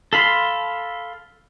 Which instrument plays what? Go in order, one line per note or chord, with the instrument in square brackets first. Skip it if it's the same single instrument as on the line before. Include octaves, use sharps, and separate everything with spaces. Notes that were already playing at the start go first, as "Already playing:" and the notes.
[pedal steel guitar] A4 F5 B5 C6